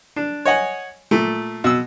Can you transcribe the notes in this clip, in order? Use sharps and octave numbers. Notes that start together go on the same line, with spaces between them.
D4
C#5 D#5 F#5 G#5
A#2 A3
B2 E6